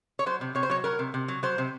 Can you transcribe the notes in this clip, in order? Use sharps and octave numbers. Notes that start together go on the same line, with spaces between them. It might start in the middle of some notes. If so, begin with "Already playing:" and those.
C#5
F#3 C5
C3
C3 C#5
C5
F#3 C#5
F#3 A#4
C3
C3
F#3
F#3 C5
C3